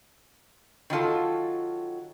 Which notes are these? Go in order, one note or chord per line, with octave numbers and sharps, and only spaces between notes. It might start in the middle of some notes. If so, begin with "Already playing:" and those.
D#3 F#3 F4 A4